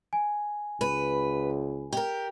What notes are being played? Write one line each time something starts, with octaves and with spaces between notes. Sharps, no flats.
G#5
C#2 B4
G4 A#4